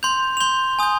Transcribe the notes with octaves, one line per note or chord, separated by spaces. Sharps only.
C6 G6 F7
F7
C6 G6 G7
G#5 D#6 G6